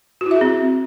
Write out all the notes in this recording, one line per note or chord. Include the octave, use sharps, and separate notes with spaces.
F#4
E4
E5
G#4
C4